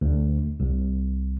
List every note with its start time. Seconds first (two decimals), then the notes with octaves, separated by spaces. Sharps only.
0.01 D2
0.60 C2